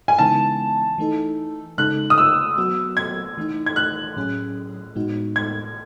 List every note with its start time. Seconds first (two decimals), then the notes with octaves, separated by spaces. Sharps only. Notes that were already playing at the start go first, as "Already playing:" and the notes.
0.08 G#5
0.19 C#3 E3 G#3 B3 D#4 A5
0.98 E3 A3 D#4 A4
1.78 C#3 G#3 D#4 A4 F#6
2.10 D#6
2.18 E6
2.58 F#3 B3 F#4
2.97 G#6
3.38 E3 A3 D#4
3.66 G#6
3.76 F#6
4.17 A2 F#3 C#4 G#4
4.95 A2 G#3 B3 D#4 F#4
5.36 G#6